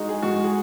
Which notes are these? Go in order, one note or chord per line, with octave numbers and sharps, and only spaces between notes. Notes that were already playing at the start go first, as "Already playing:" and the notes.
Already playing: G#3 D#4 F#4
G#4
G#2 F#4
G#4